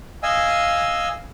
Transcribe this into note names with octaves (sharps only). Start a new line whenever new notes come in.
D#5 F5 G#5 E6